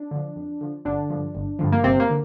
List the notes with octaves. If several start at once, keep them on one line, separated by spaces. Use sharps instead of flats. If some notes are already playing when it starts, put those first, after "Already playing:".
Already playing: D4
D3 F3
F2
D3 F3
G1 D3 D4
G2 D3 F3
G1
G2 D3 F3
A#3
G1 C3 C4
A#3
D3